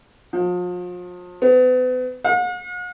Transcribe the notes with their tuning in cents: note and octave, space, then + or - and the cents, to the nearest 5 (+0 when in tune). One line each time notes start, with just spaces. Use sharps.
F3 +40
B3 +40
F#5 -45